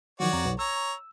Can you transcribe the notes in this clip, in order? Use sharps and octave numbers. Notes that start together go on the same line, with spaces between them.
D#3 F3 F#3 F#4 C#5 D5
F2 F#5 A#5
B1
C#5 A#5 E6